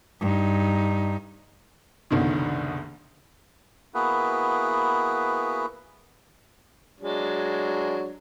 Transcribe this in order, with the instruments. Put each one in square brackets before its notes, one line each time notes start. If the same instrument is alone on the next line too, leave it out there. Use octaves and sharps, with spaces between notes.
[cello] G2 D#4
[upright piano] F#1 C2 B2 D3 D#3
[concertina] A#3 B3 E4 F#4 G#4 B4
[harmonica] F#3 G#3 D4